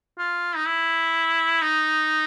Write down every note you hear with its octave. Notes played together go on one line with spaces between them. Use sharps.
F4
D#4
E4
D#4